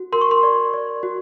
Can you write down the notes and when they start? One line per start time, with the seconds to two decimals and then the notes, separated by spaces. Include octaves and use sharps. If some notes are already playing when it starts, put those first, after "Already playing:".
Already playing: F#4
0.13 A#4 C6
0.21 C#6
0.31 C6
0.43 D5
0.74 D5
1.03 F#4